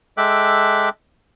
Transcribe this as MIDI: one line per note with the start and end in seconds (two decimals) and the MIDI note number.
0.17 0.89 56
0.17 0.89 69
0.17 0.89 76
0.17 0.89 79
0.17 0.89 86
0.17 0.89 90